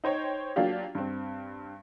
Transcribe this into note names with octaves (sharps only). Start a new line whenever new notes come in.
D#4 C5 C#5 G5
F#3 A#3 D4 F4 G4
G2 C4